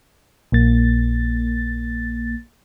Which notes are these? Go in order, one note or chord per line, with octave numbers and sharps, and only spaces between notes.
A#1 A#3 A6